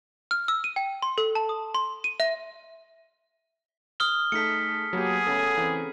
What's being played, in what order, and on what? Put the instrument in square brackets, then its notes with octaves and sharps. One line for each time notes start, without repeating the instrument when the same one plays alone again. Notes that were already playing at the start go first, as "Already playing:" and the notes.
[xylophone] F6
E6
D#7
G5
C6
A4
A5
D#6
C6
D#7
E5
[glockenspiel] D#6 F6 G7
[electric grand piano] A3 D#4 A4 [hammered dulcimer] G#4 A5 [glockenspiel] B6 C#7
[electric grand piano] F#3 A#3 G4 [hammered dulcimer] B3 [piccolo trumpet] G#4
[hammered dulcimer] C#3 A3 B3 [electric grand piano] A4
[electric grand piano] E3 C4 [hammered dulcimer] B4 A#5